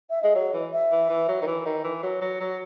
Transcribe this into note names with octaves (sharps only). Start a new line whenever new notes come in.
E5
G#3 D#5
F#3 C#5
E3
E5
E3
E3
F#3
D#3
E3
D#3
E3
F#3
F#3
F#3